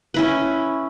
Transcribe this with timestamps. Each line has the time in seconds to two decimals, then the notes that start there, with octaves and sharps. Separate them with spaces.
0.14 C#4 E4 B4